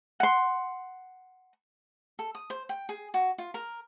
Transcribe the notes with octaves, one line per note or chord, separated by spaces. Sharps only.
F#5 C6
A4
D#6
C5
G5
G#4
F#4
F4
A#4